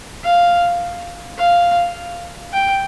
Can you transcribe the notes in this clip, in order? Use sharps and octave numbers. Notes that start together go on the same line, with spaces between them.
F5
F5
G5